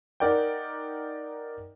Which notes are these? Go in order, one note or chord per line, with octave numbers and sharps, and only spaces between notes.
D#4 A#4 D5 F#5 G5